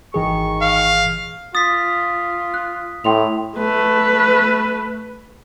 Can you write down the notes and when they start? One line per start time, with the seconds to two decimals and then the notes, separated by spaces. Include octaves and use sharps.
0.14 G#1 D#3 E3 G#4 C#6
0.62 F5
1.55 F4 D#6 A6 B6
2.54 F#6
3.04 A2 G5 C6 F7
3.58 A3 B4